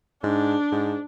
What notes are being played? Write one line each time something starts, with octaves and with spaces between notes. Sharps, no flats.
G#2 D4
G#2